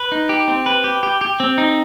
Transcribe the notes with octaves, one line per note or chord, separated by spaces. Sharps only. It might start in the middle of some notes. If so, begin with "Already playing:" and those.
Already playing: B4
D#4
G4
C4
B4
G4
G4
G4
C4
D#4